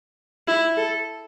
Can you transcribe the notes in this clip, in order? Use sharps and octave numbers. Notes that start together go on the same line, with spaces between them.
E4
A4